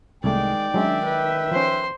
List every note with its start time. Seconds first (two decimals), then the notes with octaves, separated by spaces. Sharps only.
0.24 C2 D#3 G#3 A3 D5 G5
0.74 F#3 G#3 C#4 D4 E5
1.05 B4 E5
1.52 F3 C#4 C5 C6